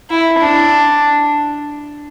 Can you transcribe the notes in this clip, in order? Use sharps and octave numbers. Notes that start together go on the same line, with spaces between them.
E4
D4